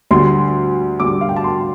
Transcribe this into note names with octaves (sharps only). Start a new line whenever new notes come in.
D2 D3 G3 C6
D2 D3 G3 D6
F5
G5
A5
C6